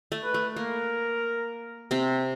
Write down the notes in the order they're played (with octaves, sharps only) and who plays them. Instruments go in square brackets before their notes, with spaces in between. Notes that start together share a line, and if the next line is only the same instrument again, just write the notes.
[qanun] A3
[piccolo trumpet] B4
[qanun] A3
[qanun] A#3 [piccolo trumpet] A#4
[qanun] C3 C4